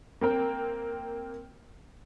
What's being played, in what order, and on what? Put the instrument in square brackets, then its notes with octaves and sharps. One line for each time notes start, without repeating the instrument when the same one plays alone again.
[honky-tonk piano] A#3 C4 A#4 G5